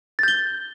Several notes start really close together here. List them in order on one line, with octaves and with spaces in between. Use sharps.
A6 G6 G7